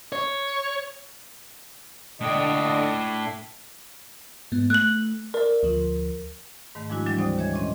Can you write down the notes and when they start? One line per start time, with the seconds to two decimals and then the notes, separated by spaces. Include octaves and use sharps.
0.12 C#5
2.21 A2 D3 D4 D#5 G5
4.52 G#2 B3
4.70 A3 F#6 F#7
5.34 A#4 D5 E5
5.63 D2 F3
6.75 G#2 D#3 A3
6.90 F3 G#3 D4 E4 F#4
7.06 E3 F#3 G3 D4
7.18 D2 C4 C5 D5 G5 D#6
7.38 D#3 G#3 C#5 D#5 E5 G#6
7.53 A#2 C#4 D#5 C6